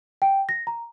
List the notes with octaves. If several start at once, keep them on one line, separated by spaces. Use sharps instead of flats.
G5
A#6
A#5